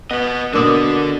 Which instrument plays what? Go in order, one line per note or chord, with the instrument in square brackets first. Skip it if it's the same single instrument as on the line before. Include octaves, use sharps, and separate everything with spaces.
[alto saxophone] B3 [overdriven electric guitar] B4 D#5
[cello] B2 [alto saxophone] D3 [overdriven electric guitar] D4 A4 [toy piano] A#4 D6 D#6